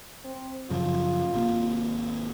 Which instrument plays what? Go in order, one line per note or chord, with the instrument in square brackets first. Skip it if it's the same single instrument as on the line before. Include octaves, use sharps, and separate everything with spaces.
[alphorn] C4
[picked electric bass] F#2 C#3 F3 [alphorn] F4
[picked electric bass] G#1 C3 A#3